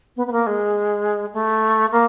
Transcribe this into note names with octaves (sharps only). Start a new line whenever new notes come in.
B3
B3
A#3
G#3
A3
A#3